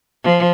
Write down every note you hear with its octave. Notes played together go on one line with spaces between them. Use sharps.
F3